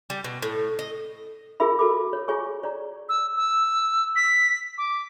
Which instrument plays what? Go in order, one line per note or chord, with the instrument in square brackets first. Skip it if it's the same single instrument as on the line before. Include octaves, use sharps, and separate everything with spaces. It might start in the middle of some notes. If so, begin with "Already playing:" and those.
[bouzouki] G3
B2
A2
D#5
[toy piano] F4 G#4 A#4 E5 B5
F#4 A4 B5 D6
C#5
F4 G#4 C#5 G#5 C#6
C#5 D5 A#5
[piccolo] E6
E6
B6
D6